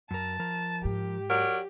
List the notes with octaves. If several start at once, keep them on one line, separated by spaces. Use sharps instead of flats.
F#2 A#4 A5
F3 A#4
G#2 G4
F#3 A#4 D5